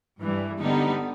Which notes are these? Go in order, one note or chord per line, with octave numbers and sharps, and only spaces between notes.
G2 E3 G3
D3 G3 B3 D#4